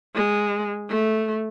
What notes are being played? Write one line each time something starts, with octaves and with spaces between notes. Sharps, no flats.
G#3
A3